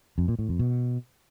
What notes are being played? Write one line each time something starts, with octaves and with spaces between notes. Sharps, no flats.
F2
A#2
A2
F2
B2